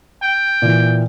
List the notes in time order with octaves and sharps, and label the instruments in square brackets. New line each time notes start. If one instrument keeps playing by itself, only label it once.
[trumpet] G5
[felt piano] A#2 E3